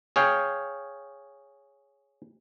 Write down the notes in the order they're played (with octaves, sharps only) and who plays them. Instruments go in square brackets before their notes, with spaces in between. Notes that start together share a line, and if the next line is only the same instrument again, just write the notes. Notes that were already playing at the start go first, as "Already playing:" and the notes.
[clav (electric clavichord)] G#4 C#5 F5 G5